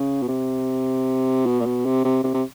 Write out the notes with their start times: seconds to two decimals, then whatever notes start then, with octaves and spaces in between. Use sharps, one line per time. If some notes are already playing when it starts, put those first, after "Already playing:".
Already playing: C#3
0.22 B2
0.28 C3
1.46 B2
1.61 A#2
1.66 B2
1.86 C3
2.05 C3
2.24 C3
2.34 C3